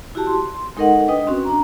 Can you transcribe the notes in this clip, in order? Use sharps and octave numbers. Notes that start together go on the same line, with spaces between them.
E4 F#4 G4 A5
C6
G#3 D#4 A4 A#4 D#5 F#5
D4 B4 D#5 G5 D#6
C4 C#4 F#4
D4 A#5